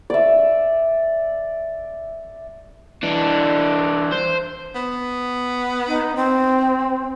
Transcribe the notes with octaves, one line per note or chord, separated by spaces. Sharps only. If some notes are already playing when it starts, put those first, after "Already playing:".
D5 E5
E3 D4
C5
B3
D#4
C4